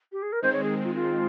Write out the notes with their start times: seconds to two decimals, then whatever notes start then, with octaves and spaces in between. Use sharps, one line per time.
0.12 G4
0.22 G#4
0.32 A#4
0.42 D#3 G#3 C4 C5
0.52 C#5
0.63 G#4
0.84 F4
0.95 F4